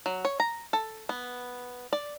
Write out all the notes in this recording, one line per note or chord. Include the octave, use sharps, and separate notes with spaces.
F#3
C#5
A#5
A4
B3
D5